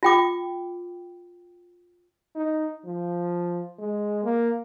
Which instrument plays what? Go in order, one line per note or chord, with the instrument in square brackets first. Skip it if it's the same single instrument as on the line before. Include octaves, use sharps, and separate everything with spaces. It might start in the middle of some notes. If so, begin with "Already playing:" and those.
[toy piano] F4 G5 D6
[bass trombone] D#4
F3
G#3
A#3